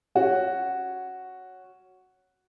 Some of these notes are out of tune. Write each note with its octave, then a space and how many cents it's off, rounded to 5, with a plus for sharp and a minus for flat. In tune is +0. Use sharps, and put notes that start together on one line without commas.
C#4 +0 F#4 +0 C#5 +0